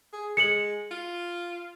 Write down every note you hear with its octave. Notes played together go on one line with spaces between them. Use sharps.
G#4
G#3 C#7 F#7
F4